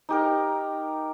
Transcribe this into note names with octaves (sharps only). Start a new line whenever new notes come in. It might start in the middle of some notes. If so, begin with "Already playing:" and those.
D#4 G4 A#4